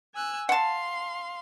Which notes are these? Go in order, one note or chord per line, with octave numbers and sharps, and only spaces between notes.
G#5 E6 F#6
F5 F#5 A5 C6